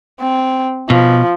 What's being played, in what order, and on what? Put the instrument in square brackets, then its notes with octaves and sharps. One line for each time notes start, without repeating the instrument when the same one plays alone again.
[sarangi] C4
[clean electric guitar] B2 [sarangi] F3